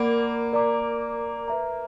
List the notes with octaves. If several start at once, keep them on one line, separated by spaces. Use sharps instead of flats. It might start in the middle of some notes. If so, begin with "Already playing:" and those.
Already playing: A#3 A#4 D5 F#5 B5 D6
A#4 D5 A#5 D6
B4 E5 A#5